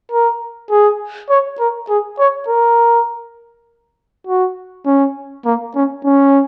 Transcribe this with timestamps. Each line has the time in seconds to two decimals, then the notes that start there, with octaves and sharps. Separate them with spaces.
0.12 A#4
0.71 G#4
1.30 C#5
1.59 A#4
1.89 G#4
2.19 C#5
2.49 A#4
4.27 F#4
4.86 C#4
5.45 A#3
5.75 C#4
6.04 C#4